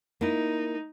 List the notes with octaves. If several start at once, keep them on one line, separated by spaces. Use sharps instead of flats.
A#3 D#4 E4